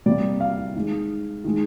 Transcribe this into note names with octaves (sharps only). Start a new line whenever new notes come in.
C3 G3 A#3 D5
F5
D#3 G#3
D#3 G#3